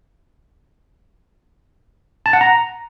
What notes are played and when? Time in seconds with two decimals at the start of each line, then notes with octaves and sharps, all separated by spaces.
2.26 A5
2.33 F#5
2.41 A#5